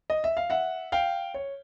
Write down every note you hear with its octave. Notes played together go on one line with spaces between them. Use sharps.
D#5
E5
F5
E5 F#5
F5 G5
C#5